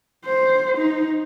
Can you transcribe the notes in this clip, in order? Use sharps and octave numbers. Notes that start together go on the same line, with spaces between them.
C5
D#4